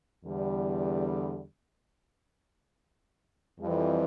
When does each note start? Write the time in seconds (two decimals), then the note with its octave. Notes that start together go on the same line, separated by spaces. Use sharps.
0.25 E2 D3 G3
3.61 F2 E3 G3